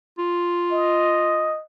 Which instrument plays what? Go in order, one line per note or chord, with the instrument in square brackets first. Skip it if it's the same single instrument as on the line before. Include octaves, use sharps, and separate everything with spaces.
[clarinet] F4
[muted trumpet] D#5